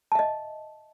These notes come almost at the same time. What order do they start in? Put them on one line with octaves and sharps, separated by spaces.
A5 E5 D#5